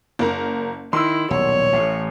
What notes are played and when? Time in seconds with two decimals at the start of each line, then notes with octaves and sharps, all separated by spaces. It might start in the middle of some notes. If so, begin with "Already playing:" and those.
0.19 F#1 A#4 A#5
0.93 D#3 E4 C6 E6
1.30 D#1 B1 C#5
1.72 A1 A2